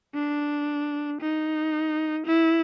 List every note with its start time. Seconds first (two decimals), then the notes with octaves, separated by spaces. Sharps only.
0.15 D4
1.21 D#4
2.26 E4